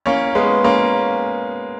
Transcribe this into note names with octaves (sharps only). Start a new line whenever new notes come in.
A#3 C#4
G#3 B3
A#3 C#4